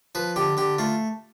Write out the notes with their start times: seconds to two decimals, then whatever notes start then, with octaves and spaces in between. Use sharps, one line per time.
0.15 F3 B4
0.36 D3 G4
0.57 D3 G4
0.79 A3 F4